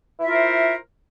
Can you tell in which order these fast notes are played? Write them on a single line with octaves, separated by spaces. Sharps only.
E4 E5 F4 A#4 C5